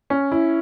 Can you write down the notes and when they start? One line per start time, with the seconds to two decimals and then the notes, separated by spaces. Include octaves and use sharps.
0.10 C#4
0.32 E4